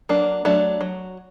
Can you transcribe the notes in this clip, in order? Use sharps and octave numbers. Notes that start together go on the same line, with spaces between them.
F#3 A#3 D4
F#3 A3 D4
F#3